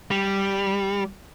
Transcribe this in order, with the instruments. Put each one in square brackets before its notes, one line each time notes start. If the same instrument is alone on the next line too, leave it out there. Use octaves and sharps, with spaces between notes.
[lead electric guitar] G3